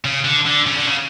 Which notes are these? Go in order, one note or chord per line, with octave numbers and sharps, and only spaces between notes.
C#3
D3
D3
C#3
D3
C#3